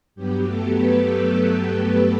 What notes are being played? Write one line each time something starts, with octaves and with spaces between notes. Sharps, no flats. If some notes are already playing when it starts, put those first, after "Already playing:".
G2 F#3 B3 G4
A3 A4
B3 B4